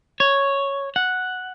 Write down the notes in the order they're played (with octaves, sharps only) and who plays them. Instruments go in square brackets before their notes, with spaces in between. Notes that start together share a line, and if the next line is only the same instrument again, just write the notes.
[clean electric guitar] C#5
F#5